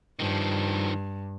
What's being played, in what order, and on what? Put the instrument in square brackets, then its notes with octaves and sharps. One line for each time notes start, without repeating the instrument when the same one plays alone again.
[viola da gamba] G2 [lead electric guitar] D#3 F3